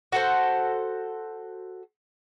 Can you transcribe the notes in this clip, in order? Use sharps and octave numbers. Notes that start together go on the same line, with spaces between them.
F#4 A4 C5